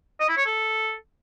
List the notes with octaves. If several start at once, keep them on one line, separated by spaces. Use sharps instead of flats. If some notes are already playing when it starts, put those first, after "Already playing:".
D#5
E4
C#5
A4